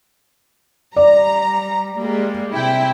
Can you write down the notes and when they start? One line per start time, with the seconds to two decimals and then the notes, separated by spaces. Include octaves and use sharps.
0.96 G3 D5 A#5
1.99 G3 G#3 A#3
2.54 C3 E4 G5